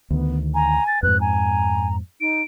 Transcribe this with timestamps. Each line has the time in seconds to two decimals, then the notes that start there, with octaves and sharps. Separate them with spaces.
0.11 D2 D#3 B3
0.54 G#5 A#5
0.87 A6
1.03 F2 G#2 B4 F#6
1.20 G#5 A#5
2.21 D#4 D7